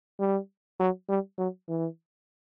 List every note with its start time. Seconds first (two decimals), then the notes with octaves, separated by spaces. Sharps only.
0.20 G3
0.80 F#3
1.09 G3
1.38 F#3
1.68 E3